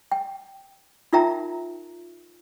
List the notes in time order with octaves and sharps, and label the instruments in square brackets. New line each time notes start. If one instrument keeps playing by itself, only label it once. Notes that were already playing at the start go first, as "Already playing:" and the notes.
[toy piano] G5
D#4 F4 A#4 E5 G5 A#5